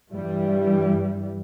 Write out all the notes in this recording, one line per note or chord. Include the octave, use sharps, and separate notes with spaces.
G2 E3 G3